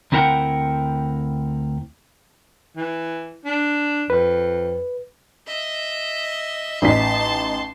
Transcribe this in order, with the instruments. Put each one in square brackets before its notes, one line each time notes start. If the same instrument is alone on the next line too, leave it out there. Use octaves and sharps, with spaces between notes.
[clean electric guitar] D2 C4 E4 A#4 F#5 G5
[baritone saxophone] E3
D4
[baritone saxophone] F2 [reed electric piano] B4
[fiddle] D#5 E5
[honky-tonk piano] A1 D#4 B6 [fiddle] A5 C6